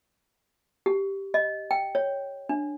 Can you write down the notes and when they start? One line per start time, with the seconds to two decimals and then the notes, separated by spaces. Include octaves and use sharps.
0.86 G4
1.34 D#5
1.71 G5
1.95 C#5
2.49 D4